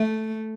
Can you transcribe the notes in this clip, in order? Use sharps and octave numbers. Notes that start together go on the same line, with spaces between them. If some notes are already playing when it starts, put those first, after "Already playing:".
Already playing: A3